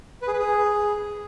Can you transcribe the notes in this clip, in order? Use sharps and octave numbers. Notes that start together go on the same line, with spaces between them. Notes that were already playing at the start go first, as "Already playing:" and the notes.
B4
G#4
B4
G#4